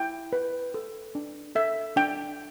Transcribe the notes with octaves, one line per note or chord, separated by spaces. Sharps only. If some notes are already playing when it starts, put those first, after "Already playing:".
Already playing: E4 G5
B4
A4
D4
A4 E5
D4 G5